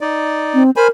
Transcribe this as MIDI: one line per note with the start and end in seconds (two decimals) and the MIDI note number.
0.01 0.63 63
0.01 0.63 74
0.54 0.71 60
0.76 0.89 70
0.76 0.88 72
0.76 0.88 80
0.76 0.88 83